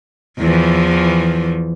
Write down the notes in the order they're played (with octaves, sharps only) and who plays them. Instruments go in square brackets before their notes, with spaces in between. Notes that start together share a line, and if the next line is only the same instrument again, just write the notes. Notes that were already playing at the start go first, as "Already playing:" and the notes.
[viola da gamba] E2 E3 F3